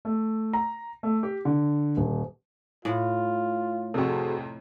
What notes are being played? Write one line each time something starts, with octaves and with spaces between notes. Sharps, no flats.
A3
A#5
A3
G4
D3
D#1
A2 F4
F2 C3 F#4 G#4 A4